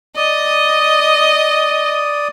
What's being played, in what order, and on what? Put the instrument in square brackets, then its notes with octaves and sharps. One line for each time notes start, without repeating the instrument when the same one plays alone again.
[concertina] D5 D#6 [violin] D#5